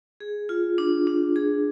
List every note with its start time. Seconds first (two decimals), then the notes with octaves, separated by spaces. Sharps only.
0.20 G#4
0.49 F4
0.78 D4
1.07 D4
1.36 G#4